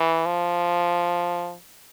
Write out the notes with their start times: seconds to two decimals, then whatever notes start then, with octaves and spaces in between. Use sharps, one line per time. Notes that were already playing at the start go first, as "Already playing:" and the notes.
Already playing: E3
0.26 F3